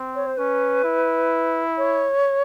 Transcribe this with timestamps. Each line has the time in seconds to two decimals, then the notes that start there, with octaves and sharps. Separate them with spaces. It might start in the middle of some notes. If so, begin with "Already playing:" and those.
Already playing: C4
0.15 C#5
0.26 C5
0.37 C#4 B4
0.84 E4
1.78 C#5